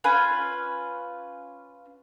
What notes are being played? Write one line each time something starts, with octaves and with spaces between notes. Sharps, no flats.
C#4 F4 B4 G#5